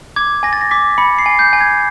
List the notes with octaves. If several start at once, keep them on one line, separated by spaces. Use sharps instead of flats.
D6 G#6
G#5 A#6
A6
A#6
D6 B6
B5 C#7
C7
G#5
G6
G#5
G#6